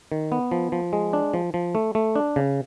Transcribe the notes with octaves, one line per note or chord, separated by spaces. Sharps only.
D#3
B3
F3
F3
G#3
D4
F3
F3
A3
A3
D4
C#3